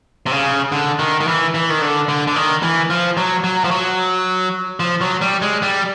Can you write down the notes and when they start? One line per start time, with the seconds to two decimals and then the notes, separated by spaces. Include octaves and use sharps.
0.26 C3
0.32 C#3
0.72 D3
0.99 D#3
1.20 D#3
1.27 E3
1.54 E3
1.70 D#3
1.82 D3
2.08 D3
2.27 D3
2.36 D#3
2.63 E3
2.90 F3
3.17 F#3
3.44 F#3
3.64 F3
3.71 F#3
4.80 F3
5.01 F#3
5.21 G3
5.42 G#3
5.62 G3